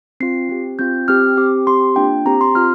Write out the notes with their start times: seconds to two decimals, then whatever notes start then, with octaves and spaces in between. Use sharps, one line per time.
0.20 C4 F4 C7
0.49 C4 G4
0.79 C4 F4 G6
1.08 C4 G4 F6
1.37 C4 G4 D6
1.67 C4 G4 C6
1.96 A#3 D4 F4 G5
2.26 C4 G4 A#5
2.41 C6
2.55 C4 F4 F6